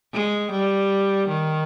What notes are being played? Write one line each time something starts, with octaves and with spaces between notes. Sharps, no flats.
G#3
G3
D#3